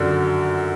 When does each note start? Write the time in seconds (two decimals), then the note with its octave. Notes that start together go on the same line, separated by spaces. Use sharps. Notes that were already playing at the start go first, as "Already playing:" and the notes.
Already playing: F#2 D3 F3